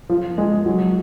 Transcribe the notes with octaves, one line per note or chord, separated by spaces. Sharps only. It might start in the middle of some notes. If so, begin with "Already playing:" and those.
F3
G#3
F#3